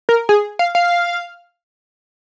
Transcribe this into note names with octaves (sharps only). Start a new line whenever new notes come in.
A#4
G#4
F5
F5